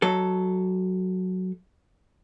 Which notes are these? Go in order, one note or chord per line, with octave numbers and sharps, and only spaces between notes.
F#3 A4